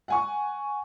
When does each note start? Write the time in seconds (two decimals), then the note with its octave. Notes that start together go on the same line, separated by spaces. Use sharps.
0.08 F#5 G#5 C#6